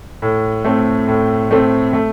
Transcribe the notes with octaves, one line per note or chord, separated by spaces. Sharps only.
A2
A3 C4
A2
A3 C4
A3